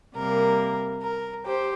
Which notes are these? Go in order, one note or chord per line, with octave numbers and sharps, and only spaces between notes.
C3 G3 A#3 A#4
A#4
G4 C5